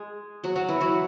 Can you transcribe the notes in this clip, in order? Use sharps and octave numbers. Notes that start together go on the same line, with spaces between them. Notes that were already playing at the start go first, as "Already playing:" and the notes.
Already playing: G#3 G#4
F#3 F#4
F#3 F#4
E3 E4
F#3 F#4